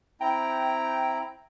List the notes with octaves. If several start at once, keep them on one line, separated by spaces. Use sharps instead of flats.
C4 E4 G5 A#5